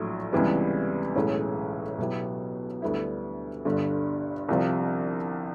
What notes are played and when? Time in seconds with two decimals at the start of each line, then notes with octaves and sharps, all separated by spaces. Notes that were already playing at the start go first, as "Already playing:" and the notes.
Already playing: A#1 A2 F#3 A3
0.32 C#2 C3 E3 G3 B3
1.15 B1 A2 E3 G#3 C#4
1.98 B2 F#3 B3 E4 G4
2.82 D2 D3 G3 B3 E4
3.65 G1 G2 D3 G3
4.48 C2 C3 F3